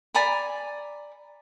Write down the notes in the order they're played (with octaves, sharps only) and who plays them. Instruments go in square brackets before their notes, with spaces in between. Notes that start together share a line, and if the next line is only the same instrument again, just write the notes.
[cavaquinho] D5 G#5 A#5 B5